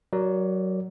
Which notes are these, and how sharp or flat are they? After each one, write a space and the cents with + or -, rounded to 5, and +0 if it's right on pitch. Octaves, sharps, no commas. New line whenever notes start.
F#3 +15 A#4 +0 D5 +0